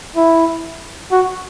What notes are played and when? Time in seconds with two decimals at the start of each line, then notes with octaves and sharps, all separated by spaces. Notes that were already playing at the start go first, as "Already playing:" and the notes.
0.17 E4
1.12 F#4